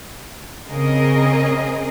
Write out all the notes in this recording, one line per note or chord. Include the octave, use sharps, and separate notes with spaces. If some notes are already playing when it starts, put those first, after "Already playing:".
C#3 C4 G#4 A#4 D#5